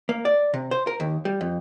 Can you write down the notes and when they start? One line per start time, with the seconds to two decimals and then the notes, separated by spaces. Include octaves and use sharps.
0.09 A#3
0.25 D5
0.54 C3
0.71 C5
0.87 A#4
1.00 D#2
1.25 G3
1.41 F2